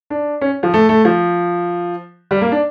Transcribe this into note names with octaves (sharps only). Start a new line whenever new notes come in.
D4
C#4
F3
A3
A3
F3
G3
A#3
D4